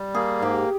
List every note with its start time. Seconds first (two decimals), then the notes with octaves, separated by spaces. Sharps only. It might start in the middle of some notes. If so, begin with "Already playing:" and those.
Already playing: G3
0.14 A#3 G#4
0.41 G#2 G4